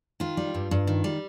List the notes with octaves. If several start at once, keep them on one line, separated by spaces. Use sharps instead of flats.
D#3 F4
G3
G2
G2
D#3
G3